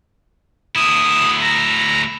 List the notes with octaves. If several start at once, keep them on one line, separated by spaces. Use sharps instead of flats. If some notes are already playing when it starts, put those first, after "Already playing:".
D2 E4 D#6
A#5